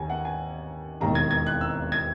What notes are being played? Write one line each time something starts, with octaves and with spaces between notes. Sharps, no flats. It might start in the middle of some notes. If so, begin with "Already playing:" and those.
Already playing: D#2 D#3 A#3 G#5
F#5
G#5
E1 D#2 D#3 A#5
G#6
G#6
F#6
E6
G#6